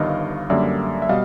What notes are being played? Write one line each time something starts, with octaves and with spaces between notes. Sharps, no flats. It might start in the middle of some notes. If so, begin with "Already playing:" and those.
Already playing: G1 G2 D#3 D#5 F5
F#2 D3 G3 A#3 D5 E5
E5
B2 G3 D#5 F5